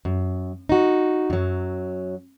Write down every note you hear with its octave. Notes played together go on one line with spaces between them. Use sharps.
F#2
D#4 F#4
F#2 F#3